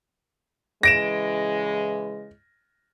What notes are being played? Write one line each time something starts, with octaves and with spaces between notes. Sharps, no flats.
C#3 E3 G#3 A#6 D7 E7